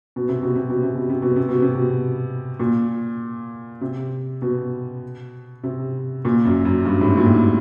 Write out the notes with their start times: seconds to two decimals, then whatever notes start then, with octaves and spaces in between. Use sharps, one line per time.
0.16 B2
0.29 C3
0.43 B2
0.56 C3
0.70 B2
0.83 C3
0.95 B2
1.10 C3
1.22 B2
1.36 C3
1.49 B2
1.62 C3
1.75 B2
2.59 A#2
3.81 C3
4.42 B2
5.64 C3
6.25 A#2
6.45 F#2
6.65 F#2
6.85 G2
7.01 A2
7.07 G#2
7.17 A#2
7.26 A2